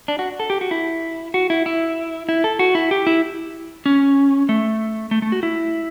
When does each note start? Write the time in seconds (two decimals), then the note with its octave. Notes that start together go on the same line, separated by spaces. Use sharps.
0.08 D4
0.19 F#4
0.40 A4
0.50 G4
0.61 F#4
0.71 E4
1.34 F#4
1.50 E4
1.66 E4
2.29 E4
2.44 A4
2.59 F#4
2.75 E4
2.91 G4
3.07 E4
3.86 C#4
4.49 A3
5.11 A3
5.22 A3
5.32 F#4
5.43 E4